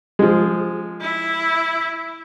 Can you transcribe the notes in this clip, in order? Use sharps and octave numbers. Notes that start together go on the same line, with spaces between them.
F3 G#3
E4